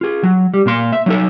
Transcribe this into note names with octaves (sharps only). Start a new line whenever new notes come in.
F4 G#4
F#3
G3
A#2 A#3 C6
E5
F#3 D#4 A4